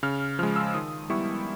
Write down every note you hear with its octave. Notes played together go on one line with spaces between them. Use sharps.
C#3 F6
F3 G#3 F6
E6
D#3 D#6
G3 B3 E4 C#6